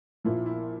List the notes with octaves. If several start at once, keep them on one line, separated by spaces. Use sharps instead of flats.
A#1 A#2 F3 E4
E4